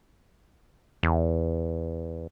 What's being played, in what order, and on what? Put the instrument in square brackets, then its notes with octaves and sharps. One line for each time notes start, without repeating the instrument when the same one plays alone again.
[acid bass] E2